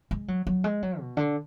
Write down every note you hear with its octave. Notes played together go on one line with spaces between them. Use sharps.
G#3
F#3
F#3
G#3
F#3
B2
D3